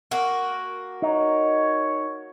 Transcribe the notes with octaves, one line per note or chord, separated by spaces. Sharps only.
A#3 F#4
D#4 C#5